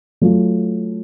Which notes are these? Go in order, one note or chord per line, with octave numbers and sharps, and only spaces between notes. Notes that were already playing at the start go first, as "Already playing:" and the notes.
F#3 A3 F4